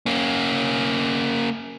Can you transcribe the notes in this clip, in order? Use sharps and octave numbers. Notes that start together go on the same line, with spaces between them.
A#3 C#4